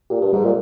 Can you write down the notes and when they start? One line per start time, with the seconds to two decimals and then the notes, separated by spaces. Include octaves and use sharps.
0.10 A#2 G4
0.21 G2
0.33 G#2 G3
0.44 A#2